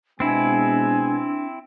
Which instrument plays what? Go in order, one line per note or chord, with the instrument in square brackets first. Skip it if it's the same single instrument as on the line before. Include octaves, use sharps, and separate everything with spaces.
[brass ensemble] B2 G#3 B3 [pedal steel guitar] C4 E4 [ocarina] D4 [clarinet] G#5